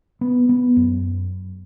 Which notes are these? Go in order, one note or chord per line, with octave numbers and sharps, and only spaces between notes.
B3
B3
F#2